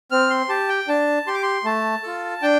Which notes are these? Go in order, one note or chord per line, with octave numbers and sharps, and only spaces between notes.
C4 F6
C6
G4 A5
G5
D4 A5
G4 C6
D6
C6
A3 A5
F4 A4
D4 G5